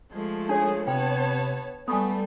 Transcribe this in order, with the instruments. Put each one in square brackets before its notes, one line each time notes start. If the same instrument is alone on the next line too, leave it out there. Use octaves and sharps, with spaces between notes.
[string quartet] F3 G#3 A3
[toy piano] D4 C#5 [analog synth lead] G#4
[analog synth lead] C3 [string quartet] B3 C#5 A5 [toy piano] G5
[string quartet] G3 A3 [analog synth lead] B3 [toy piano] G#5 C#6 D#6